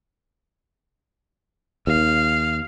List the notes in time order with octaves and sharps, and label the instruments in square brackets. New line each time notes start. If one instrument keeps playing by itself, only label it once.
[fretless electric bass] D#2 [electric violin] F5